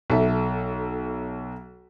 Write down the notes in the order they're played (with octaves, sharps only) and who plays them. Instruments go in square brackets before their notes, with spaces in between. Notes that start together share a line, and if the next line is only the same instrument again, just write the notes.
[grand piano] B1 A4 E5